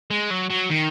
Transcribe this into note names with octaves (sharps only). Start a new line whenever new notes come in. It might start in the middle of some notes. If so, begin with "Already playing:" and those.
G#3
F#3
F#3
D#3